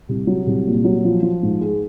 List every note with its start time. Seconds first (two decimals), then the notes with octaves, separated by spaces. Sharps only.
0.09 C2
0.27 F#3
0.47 C2
0.66 A#2
0.84 F#3
1.05 F3
1.23 F3
1.43 G#2
1.61 G#3